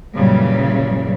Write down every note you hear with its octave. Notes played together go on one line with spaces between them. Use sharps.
F#2 A#2 C#3 E3 F#3 G3